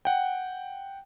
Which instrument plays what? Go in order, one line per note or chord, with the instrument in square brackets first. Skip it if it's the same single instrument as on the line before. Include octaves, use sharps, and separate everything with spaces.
[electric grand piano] F#5 G5